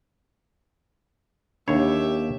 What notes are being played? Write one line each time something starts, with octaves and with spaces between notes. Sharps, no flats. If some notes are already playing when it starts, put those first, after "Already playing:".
D#2 D4 G4 C#5 E5